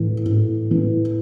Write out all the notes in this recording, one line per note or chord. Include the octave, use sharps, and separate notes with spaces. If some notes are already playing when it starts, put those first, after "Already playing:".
Already playing: A2 E3
A2
E3